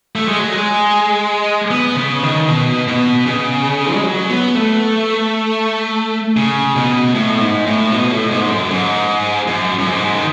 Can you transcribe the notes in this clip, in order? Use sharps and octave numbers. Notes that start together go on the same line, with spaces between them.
A3
G#3
F#3
G#3
B3
C#3
D#3
B2
B2
C#3
G#3
F#3
B3
A3
C#3
B2
A2
G#2
A2
B2
A2
G#2
F#2
G#2
F#2
F#2
G#2
D#3